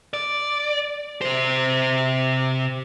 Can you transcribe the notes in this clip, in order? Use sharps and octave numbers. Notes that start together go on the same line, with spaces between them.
D5
C3 C5